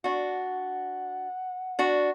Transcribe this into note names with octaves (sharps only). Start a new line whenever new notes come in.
D4 F#4 F#5
D4 F#4